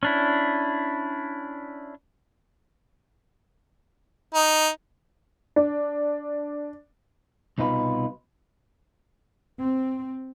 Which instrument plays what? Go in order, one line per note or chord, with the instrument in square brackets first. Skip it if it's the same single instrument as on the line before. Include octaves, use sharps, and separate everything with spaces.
[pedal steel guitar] C#4 D4 E4
[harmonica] D#4
[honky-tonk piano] D4
[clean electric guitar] C2 B2 D#4 F4 B4
[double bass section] C4